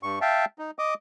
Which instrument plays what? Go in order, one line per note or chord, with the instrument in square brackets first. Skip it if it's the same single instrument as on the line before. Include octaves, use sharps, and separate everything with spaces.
[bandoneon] G2 C#6
E5 F5 G5 A5
D#4
D#5 D6 D#6